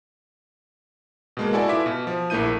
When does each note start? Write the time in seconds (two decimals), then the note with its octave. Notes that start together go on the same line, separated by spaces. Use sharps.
1.37 B2 G#3 A#3
1.53 E4 F#4 A4 D5 G#5 A5
1.68 E4 F4 B4 E5 D6 B6
1.86 B2
2.07 F3
2.30 A#1 A3 A#3 E4 G6 D#7